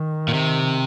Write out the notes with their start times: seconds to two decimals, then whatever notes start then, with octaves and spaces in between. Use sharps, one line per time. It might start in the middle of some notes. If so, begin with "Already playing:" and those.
Already playing: D#3
0.28 A#2
0.34 C3